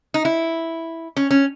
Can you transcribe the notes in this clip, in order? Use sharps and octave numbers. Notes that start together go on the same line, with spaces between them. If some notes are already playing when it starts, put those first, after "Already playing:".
D#4
E4
C#4
C#4